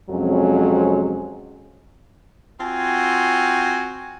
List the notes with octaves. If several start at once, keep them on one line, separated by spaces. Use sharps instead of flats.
F2 C3 F#3 G#3 C#4
C4 F4 F#4 G#5